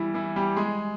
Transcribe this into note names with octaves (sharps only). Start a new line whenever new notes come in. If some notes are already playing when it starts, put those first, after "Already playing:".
Already playing: E3 G3 E4
E3 E4
G3 G4
G#3 G#4